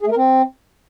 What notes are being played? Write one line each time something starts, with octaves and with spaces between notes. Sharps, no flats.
G#4
A3
A#4
C4